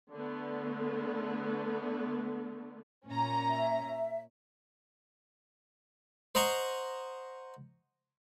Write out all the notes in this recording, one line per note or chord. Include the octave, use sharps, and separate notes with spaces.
D3 A3 B3
A#2 C#4 A#5
E5
C5 D#5 F#5 A#5 C6 C#6